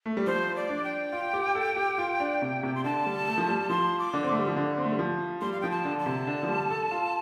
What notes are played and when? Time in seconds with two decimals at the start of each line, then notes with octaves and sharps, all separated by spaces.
0.06 A3
0.17 G3
0.27 F3 C5
0.56 D5
0.69 D4
0.84 G5
1.13 F4
1.33 G4
1.55 A4
1.76 G4
1.98 F4
2.20 D4
2.42 C3
2.63 C3
2.75 C6
2.84 D3 A5
3.06 G3
3.28 A3
3.38 F3
3.48 G3
3.69 F3 C6
3.99 D6
4.13 D3
4.23 C4
4.31 A3
4.39 G3
4.48 F3
4.56 D3
4.78 C4
4.84 A3
4.92 G3
4.99 F3
5.41 G3 C6
5.52 F5
5.61 F3 G5
5.71 A5
5.85 D3
5.99 A5
6.06 C3
6.27 D3
6.43 F3
6.48 G3
6.70 A4
6.91 F4